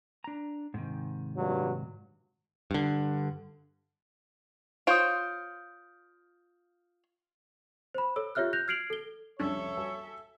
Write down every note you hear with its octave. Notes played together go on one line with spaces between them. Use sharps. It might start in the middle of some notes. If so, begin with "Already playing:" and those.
D4 A#5
G#2 C3 D#3
G2 A#2 F#3
G2 D3
F4 C5 C#5 D#6 G6 D7
C5 B5
A4 C#5 E6
F4 G4 C#5 E5 F6 F#6
F#6 G6 A#6 F7
F6 G#6 C7 D7 F7 F#7
A4 G7
C2 F2 C#3 C#4 D4 A4 C#5 E5
G2 F#4 G#5 A5